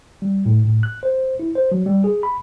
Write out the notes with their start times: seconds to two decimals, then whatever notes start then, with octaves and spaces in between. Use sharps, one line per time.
0.22 G3
0.46 A2
0.65 A2
0.83 F#6
1.03 C5
1.39 E4
1.55 C5
1.72 F#3
1.86 G3
2.04 G#4
2.23 B5